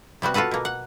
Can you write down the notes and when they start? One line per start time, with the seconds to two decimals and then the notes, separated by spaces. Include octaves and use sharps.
0.22 C3 G3 B3 F#4
0.34 F4 F#4 A4 B4 F#5
0.51 B2 A#3
0.65 F#5